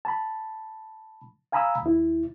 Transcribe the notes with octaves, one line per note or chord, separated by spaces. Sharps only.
A5 B5
F5 G#5 A#5 B5 D#6 E6
D#2 E4